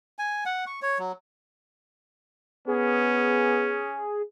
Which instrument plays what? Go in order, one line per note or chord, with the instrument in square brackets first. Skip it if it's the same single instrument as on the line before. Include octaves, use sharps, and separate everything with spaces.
[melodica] G#5
F#5
C#6
C#5
F#3
[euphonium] B3 [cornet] C#4 [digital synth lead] G#4